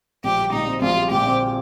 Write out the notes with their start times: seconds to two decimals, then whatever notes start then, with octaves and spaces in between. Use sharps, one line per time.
0.24 A#1 G4
0.39 G3
0.52 A#2 D#4
0.67 C4
0.82 A#1 F4
0.97 G3
1.11 A#2 G4
1.27 C4